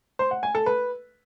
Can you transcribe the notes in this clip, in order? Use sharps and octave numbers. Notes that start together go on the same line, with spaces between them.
C5
F#5
G#5
A4
B4